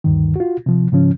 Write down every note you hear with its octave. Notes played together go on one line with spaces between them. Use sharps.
D2 G2 D#3
F4 F#4
C3 F3
G#2 C#3 F3 C#4